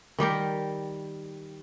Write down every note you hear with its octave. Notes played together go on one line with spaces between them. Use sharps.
D#3 G3 G4 A#4